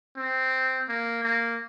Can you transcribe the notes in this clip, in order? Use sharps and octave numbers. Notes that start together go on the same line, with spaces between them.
C4
A#3
A#3